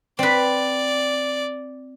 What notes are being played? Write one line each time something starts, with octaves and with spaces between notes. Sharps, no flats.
C4 B4 D5